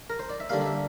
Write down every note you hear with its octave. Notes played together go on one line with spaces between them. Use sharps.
A#4
C5
D5
E5
D3 G3 A#3 F5
D5
E5